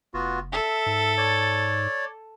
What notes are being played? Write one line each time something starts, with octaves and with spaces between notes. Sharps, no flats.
F1 B3 F4 F#4
A4 E5
G#2
C#5 D5